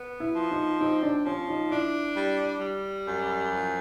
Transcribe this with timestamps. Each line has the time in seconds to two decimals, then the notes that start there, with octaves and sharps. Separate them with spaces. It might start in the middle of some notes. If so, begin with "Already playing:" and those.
Already playing: B3
0.20 E4
0.35 F3
0.51 D#4
0.80 C4 D#4
1.03 D4
1.25 F3 C#4
1.49 D#4
1.70 D4 E4
2.16 G3
2.61 G3
3.07 F#2
3.52 F3